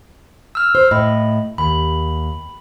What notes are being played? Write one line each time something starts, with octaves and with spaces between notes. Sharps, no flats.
E6 F6
C5
A2 D#5 B5
D#2 B5